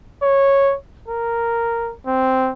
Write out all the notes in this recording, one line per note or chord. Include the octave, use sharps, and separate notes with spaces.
C#5
A#4
C4